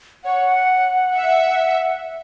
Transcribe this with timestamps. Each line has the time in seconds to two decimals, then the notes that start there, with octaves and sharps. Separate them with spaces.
0.24 C#5 F#5
1.17 E5